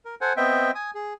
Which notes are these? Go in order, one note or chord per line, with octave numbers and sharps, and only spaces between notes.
A#4
A4 C5 F#5 G#5
B3 C4 D#5 E5 G5
G#5 D#6
G#4